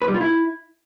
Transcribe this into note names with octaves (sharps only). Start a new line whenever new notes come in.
B4
G3
F4
E4